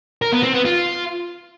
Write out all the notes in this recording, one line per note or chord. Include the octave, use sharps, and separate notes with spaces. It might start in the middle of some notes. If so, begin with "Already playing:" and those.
A#4
B3
C4
B3
F4